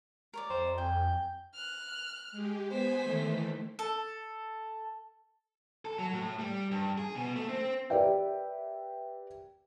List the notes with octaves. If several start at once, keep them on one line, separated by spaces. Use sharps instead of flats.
A#4 C#5 D5
F2 C5
G5 G#5
F6 F#6
G#3 G4
B3 C5 G#5 B6
D#3 E3 A3
A4
A4
F#3
A2
G3
G2
G#4
B2
A3
C4
G4 A#4 B4 D5 E5 G5